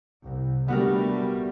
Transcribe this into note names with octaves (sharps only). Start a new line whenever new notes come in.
C2
D3 G3 A3 B3 F#4 A#4